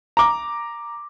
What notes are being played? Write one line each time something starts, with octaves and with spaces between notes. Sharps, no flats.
A#5 D6